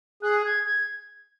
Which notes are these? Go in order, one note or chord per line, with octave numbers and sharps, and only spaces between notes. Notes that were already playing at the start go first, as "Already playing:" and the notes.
G#4 F#6
G#6
G#6